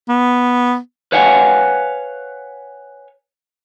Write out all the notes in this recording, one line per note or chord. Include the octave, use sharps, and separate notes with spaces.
B3
B4 C#5 F5 F#5 G#5